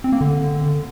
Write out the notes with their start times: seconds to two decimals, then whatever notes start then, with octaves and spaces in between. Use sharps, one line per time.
0.04 C4
0.12 A#3
0.21 D3